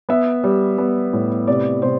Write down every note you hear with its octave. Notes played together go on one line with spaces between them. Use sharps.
B3 E5
G3
B3
A2
C3 D5
C3 C5